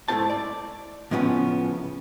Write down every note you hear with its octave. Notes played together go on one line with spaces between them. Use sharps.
G#2 A3 E4 F4 C5 A5
D5
A2 C#3 F3 G3 B3 C#4